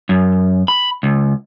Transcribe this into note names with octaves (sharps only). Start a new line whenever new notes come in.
F#2
B5
C#2